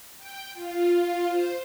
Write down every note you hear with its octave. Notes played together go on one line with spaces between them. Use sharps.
G5
F4
F4
C5